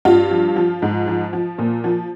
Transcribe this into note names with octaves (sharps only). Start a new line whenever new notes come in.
G2 F4
F3
F3
G#2
F3
F3
A#2
F3